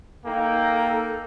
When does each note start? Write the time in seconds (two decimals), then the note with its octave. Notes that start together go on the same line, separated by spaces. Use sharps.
0.25 A#3 D#4 A4 G5